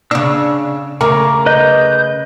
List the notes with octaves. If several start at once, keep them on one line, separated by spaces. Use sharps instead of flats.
C#3 D4 E6
C#3 A3 A#4 D6
B4 D#5 G6